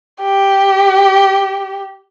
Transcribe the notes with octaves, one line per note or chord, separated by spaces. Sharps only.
G4